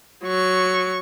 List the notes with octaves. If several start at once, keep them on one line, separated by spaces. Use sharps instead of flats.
F#3 C#6